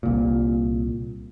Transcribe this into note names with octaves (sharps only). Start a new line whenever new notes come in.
C2 A#2